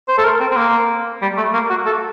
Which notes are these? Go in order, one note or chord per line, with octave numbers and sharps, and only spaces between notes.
C5
A4
A#4
C4
C4
A#3
G3
A3
A#3
F#4
A4